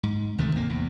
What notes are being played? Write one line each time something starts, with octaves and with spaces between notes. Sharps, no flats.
G#2
D2 C3 D#3 A3
G#1 A#3
E2